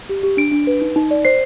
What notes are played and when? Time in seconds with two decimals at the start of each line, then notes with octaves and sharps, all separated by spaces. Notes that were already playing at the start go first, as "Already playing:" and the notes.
0.09 G4
0.23 G4
0.37 D4 D7
0.52 D4
0.67 B4
0.81 D#4
0.96 D#4
1.11 D5
1.25 C5 C7